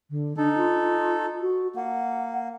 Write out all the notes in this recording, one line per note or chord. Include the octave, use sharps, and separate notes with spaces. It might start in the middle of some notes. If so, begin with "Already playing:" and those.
D3
D4 D#4 A4
F4
F#4
A#3 F#5